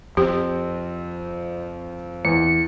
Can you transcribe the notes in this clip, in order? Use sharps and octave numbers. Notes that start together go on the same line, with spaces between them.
F2 C4 G4
E2 C#7